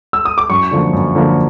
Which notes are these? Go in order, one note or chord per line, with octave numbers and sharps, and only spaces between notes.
E6
D#6
D6
F#2 C#6
D3 F3 A#3
F#2
D3 F3 A#3